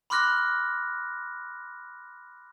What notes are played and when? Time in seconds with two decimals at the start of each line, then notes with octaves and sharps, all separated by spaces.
0.10 B5 C6 D6 F6 F#6 A#6